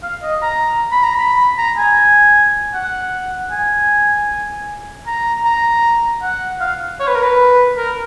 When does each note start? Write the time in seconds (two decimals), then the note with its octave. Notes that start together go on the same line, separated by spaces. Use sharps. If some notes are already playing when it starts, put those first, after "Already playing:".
0.03 F5
0.23 D#5
0.42 A#5
0.92 B5
1.03 A#5
1.15 B5
1.58 A#5
1.78 G#5
2.74 F#5
3.51 G#5
5.07 A#5
5.45 A#5
6.22 F#5
6.61 F5
7.00 C#5
7.07 B4
7.15 A#4
7.23 B4
7.77 A#4